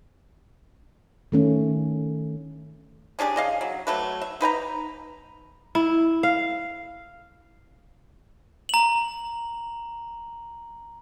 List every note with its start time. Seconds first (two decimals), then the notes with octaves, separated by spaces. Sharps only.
1.32 D#3 A3 C#4
3.19 C#4 D4 G4 G#4
3.36 C#3 D#5 F5
3.61 F#3
3.87 F#3 A3 B4
4.21 E5
4.41 D#4 B4 G5 A#5
5.75 E4
6.23 F5
8.69 A#5 F#7